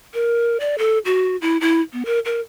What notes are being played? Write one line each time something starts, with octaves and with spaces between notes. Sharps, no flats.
A#4
D5
A4
F#4
E4
E4
B3
A#4
A#4